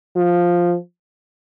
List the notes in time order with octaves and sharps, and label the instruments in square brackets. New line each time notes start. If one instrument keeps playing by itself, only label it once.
[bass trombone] F3